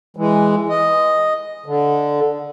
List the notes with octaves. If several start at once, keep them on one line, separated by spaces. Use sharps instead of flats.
E3 G#3
D#5
D3